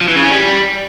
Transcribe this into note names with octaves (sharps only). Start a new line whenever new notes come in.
F3
E3
C#3
C#4
G3